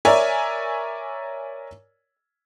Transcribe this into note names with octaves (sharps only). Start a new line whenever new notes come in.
A#4 C#5 D5 E5 G#5